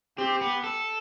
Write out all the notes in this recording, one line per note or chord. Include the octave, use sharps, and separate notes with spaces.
C4 G4
B3
A4